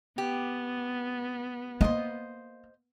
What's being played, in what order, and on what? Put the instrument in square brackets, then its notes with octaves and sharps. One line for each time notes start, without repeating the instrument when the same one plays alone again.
[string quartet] B3 [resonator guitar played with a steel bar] G4
[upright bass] A#3 [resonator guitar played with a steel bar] C5 D#5